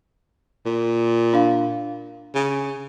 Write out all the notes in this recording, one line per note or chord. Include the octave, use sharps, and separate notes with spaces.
A#2
D4 F5
C#3